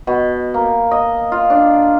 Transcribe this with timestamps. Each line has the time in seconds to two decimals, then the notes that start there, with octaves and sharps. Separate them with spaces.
0.07 B2
0.54 A#3
0.91 D#5
1.32 F4
1.50 D4